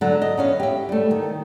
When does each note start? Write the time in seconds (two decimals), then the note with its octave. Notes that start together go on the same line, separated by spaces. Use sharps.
0.01 D3 F#3 A5
0.22 D#5
0.37 B3 C#4 F5
0.60 G4 E5
0.89 G3 A3
1.11 D#3